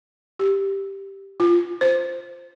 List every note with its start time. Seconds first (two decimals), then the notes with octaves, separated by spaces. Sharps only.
0.39 G4
1.40 F4
1.81 C5